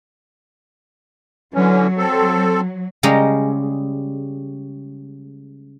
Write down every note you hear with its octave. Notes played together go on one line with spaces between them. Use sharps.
D3 E3 F#3 C#4
C4 A4
C#3 G3 G#3 G4 A#5